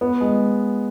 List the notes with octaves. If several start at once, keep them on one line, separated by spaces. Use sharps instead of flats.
B3
G#3